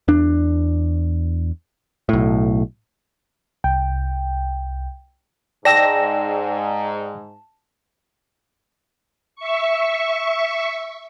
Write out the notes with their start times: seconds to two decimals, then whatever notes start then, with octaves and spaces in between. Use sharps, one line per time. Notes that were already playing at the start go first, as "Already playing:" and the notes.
0.08 E2 D4
2.09 B1 A2
3.64 C2 G5
5.65 G#2 D5 G5 A5 E6 A#6 E7
9.36 E5 C#6